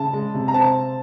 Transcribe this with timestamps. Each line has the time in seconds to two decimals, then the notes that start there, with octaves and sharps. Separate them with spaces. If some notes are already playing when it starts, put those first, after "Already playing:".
Already playing: C#3 A5
0.13 G#3
0.34 C3
0.48 A#5
0.54 C4 A5